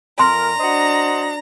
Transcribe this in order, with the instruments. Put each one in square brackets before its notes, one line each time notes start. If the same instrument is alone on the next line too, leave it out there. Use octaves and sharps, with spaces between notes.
[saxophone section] F2 A#4 [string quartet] A#5 [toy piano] C6
[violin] D4 [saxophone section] F#4 C5 D#5